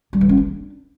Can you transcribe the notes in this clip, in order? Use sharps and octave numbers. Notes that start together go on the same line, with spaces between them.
G3
E3
C#4
D4